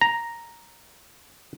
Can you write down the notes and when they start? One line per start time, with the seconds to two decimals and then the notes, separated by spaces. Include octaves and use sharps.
0.01 A#5